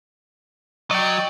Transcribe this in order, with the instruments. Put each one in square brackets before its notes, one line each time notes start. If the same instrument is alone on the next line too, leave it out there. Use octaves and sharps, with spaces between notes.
[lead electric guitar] F#3 [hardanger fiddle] D5 [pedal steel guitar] D#5 G5